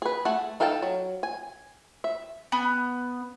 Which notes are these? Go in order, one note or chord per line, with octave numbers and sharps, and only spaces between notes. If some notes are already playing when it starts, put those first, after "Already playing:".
G#4 B4
A3 G#4 A4 F#5
D#4 A4 F5 G5 A5
F#3
G#5
E5
B3